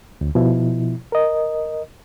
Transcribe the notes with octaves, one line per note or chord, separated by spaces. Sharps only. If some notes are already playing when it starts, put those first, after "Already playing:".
D2
B2 F3 E4
A#4 D#5